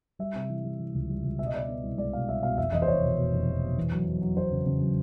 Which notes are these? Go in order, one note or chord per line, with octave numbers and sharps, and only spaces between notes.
G3 E5
C3
E3
G3
E3
C#2
G3
C#2
B2 E5
D#5
B2 D5
D#5
B3
C2
G#3 D5
B2 F5
C2 E5
B2 F5
F1 E5
E2 D#5
C5
F1 C#5
B2
B2
F1
E2
B2
E2
F#3
F#3
F#3
E2 C5
C#3
C#3
F#3